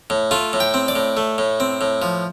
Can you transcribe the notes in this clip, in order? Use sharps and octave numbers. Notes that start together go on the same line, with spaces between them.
A2
A3 F4
A2
G5
C4
D5
A2
A3
A2
C4
A2
F3